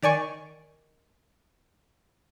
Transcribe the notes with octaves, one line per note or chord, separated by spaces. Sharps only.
D#3 D5 G#5 C#6